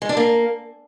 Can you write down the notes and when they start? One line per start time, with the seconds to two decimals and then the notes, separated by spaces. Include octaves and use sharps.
0.02 G#3
0.09 D4
0.17 A#3